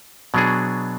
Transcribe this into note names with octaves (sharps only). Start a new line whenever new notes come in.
B2 F#3 B3 D4 G#4